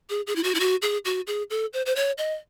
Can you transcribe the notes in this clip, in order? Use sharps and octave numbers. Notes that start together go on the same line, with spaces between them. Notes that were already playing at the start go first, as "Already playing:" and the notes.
G#4
G#4
E4
F#4
E4
F#4
G#4
F#4
G#4
A4
C5
C5
C#5
D#5